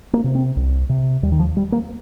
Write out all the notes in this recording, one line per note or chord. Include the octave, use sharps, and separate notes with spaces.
A#3
C3
C4
C2
C3
D#2 G3
D#3
F3
G3
A#3